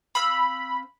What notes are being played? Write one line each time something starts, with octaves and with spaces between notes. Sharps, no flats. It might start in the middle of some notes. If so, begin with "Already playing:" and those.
C4 F5 B5 E6